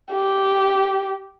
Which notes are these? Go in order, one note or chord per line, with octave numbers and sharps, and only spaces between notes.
G4